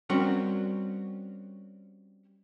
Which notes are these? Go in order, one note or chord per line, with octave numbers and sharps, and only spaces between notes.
G3 C4 C#4 F#4 A#4 F#5